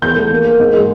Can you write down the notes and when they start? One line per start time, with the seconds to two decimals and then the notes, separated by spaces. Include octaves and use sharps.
0.02 E2 G6
0.16 A3
0.31 A#3
0.45 A#3
0.60 G#2
0.73 G#3